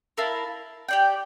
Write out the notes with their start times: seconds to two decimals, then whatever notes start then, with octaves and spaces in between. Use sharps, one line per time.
0.18 E4 A#4 F5 A5
0.89 G4 D5 G5